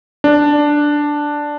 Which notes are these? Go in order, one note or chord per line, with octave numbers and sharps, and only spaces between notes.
D4